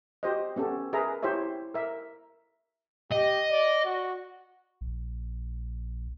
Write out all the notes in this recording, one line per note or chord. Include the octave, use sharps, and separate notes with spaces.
F#4 G4 C5 D#5
B3 C#4 G4 A4
G#4 A#4 B4 E5 A#5
E4 G4 C5 C#5 E5
A#4 E5
G4 D#5
D5
F#4
A#1